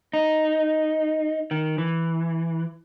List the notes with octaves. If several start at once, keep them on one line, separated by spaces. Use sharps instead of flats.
D#4
D#3
E3